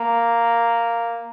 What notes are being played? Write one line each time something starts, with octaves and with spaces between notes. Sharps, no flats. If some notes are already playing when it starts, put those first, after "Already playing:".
Already playing: A#3